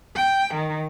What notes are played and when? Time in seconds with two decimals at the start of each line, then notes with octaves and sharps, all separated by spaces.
0.16 G5
0.54 D#3